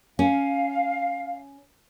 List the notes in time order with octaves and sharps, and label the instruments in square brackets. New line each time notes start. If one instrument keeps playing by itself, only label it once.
[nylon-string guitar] C#4 [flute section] F5